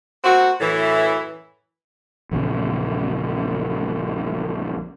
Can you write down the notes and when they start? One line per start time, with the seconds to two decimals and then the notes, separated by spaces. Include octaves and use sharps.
0.24 A#3 C4 F#4
0.61 F#2 A2 E3
2.31 A#1 E2 C#3